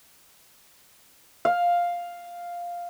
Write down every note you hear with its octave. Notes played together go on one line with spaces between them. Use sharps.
F5